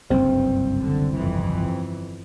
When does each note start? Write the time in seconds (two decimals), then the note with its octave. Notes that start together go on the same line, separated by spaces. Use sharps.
0.10 F#1 C2 G2 C4
0.80 D3
1.16 G1 F2 E3